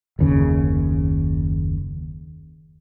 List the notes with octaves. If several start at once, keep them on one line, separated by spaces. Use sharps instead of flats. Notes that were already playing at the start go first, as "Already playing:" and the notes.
F#1 D#2 C#3